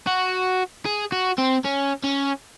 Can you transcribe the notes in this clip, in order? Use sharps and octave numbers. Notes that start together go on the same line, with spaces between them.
F#4
G#4
F#4
C4
C#4
C#4